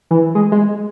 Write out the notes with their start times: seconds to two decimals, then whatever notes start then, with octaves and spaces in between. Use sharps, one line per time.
0.11 E3
0.35 G#3
0.52 G#3